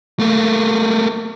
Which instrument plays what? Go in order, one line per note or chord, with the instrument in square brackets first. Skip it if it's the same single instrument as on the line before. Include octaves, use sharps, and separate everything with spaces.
[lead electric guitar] A3 A#3